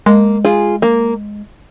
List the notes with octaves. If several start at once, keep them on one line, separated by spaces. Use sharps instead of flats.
G#3 A#3
F4 G#4
A#3